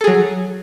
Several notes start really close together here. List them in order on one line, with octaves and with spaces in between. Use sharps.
A4 G#4 F#3